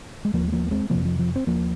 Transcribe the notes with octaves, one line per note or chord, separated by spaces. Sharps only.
G#3
D#2 F3 A#3
G#3
F3 A#3
A#3
G#3 C4
F2 C3 F3 A#3
F3
F3
C4
D#2 F3 A#3